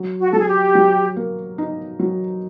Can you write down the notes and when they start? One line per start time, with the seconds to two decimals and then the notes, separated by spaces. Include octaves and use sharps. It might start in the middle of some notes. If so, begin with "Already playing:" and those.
Already playing: F#3
0.20 F#4
0.32 F#3 A4
0.39 G#4
0.47 G4
0.75 F#3
1.16 A#3
1.58 D#4
1.99 F#3